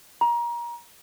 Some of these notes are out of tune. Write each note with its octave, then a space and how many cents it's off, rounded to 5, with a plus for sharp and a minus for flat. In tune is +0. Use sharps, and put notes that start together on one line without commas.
A#5 +25